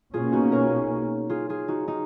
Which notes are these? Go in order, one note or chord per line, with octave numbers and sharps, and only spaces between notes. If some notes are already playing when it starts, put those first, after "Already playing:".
B2 A#3 C#4 F4 G#4
D#4 F#4
A#4 C#5
F4 G#4
F4 G#4
D#4 F#4
D#4